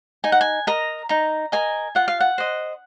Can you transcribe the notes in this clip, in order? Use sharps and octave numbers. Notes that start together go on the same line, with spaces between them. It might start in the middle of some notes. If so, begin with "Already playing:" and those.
D#4 G#5
F#5
G#5
A#4 D#5 A#5
D#4 A#5
A#4 D#5 G#5
F4 F#5
F5
F#5
C5 D#5